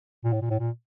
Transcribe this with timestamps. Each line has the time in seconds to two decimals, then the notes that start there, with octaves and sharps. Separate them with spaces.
0.24 A#2
0.33 A2
0.41 A#2
0.50 A2
0.59 A#2